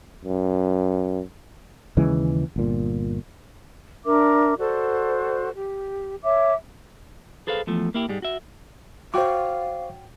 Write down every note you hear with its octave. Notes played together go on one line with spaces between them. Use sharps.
F#2
D#2 C#3 E3 G#3
G1 A#2
D4 A#4 E5 D6
F#4 A4 C5 D5
G4
C#5 E5 D6
G#4 A4 B4 C5 E5 F5
E2 F3 A3
A#3 E4 G4
G#2 G3 G#3
F#4 E5
F#4 C5 C#5 F5 G5 C#6 D6